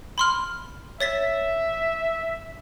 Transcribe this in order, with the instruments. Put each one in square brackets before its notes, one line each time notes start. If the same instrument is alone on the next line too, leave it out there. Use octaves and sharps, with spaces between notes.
[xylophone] B5 C6 F6
[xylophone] C#5 A6 B6 [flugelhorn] E5